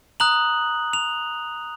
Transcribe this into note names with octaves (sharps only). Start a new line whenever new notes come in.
A#5 D#6 F#6 F#7
F7